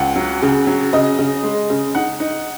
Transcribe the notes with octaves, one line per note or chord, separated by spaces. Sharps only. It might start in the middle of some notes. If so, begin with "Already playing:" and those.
Already playing: C#2 F#5
F#3
C#3
F#3
C#3 D#5
C#3
G#3
C#3
D#4 F#5
D#4